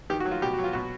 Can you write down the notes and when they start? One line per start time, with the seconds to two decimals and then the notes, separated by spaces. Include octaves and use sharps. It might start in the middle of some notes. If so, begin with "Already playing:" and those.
0.10 D#3 G4
0.20 F#4
0.26 F#3
0.31 F4
0.42 B2 G4
0.53 F#4
0.58 F#3
0.64 F4
0.73 B2 F#4